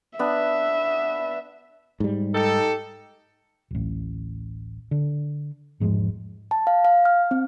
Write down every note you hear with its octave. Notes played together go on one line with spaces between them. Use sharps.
B3 D4 E5
G#2 G3
D#4 G4 A4
D1 A1
D3
E1 G#2 F3 G#3
A5
F5
F5
F6
C4